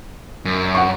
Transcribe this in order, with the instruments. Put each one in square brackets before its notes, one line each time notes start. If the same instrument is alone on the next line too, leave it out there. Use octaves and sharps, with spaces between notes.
[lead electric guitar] F#2
[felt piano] F#5 C#6